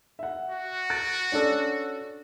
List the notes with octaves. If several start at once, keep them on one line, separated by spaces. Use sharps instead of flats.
E5 F#5
F#4
F#6 A6 D7
C#4 D4 A4